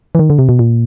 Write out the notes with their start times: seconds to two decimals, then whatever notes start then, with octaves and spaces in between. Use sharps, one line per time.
0.15 E3
0.19 D#3
0.30 D3
0.39 C3
0.49 B2
0.59 A#2